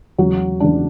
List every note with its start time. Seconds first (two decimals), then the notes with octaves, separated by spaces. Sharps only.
0.18 E2 C#3 F#3 F#4
0.60 E2 C#3 F#3 D4